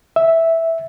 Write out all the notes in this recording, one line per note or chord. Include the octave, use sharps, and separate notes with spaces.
E5